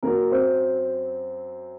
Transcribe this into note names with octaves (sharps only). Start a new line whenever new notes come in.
F#2 F#3 A#3 A#4
C4 C5